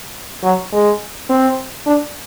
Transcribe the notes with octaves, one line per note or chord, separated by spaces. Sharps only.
F#3
G#3
C4
D4